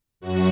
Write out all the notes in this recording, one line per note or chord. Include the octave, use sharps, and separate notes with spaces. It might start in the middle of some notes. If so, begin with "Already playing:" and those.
F#2 F#4